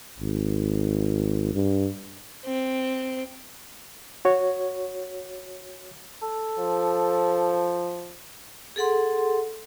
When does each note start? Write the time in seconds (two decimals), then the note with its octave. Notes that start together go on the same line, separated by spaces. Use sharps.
0.19 G#1
1.54 G2
2.45 C4
4.25 F#4 C#5
6.22 A4
6.59 F3
8.76 G#4 A4 F#5 C6